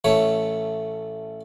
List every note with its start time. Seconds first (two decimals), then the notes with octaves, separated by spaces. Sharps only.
0.04 A1 A3 C#5